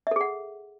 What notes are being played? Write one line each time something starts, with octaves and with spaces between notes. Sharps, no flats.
G#4 A4 E5 F#5